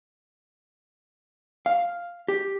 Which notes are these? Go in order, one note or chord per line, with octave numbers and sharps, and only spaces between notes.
F5
G4